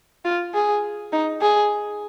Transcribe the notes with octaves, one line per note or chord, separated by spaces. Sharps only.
F4
G#4
D#4
G#4